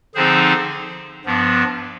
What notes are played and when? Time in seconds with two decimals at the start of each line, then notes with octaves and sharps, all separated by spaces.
0.15 D3 F3 C4 D#4 G#4 C5
1.25 G2 F3 B3 D4